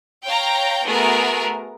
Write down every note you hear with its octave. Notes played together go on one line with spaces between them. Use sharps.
C#5 F5 G5 A#5
A3 B3 F#4 G#4 A#4